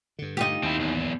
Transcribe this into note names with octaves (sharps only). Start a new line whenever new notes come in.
G2 D3
D#4 F4 G4
D#2 C4 E4
B1 E2